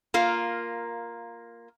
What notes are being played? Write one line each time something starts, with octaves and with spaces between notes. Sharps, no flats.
A#3 F4 A#4